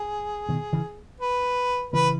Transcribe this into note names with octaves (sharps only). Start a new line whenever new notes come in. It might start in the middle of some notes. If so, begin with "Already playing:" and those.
Already playing: G#4
B2 D#3
C#3 E3
B4
C#3 E3 B4